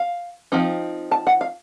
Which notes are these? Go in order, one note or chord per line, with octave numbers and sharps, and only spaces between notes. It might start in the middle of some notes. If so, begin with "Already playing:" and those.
Already playing: F5
F3 C4 D#4
A5
F#5
F5